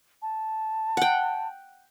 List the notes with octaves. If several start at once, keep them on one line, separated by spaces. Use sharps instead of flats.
A5
F#5 G5